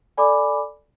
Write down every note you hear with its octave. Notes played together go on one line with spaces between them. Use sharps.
A4 D5 G#5 B5 D6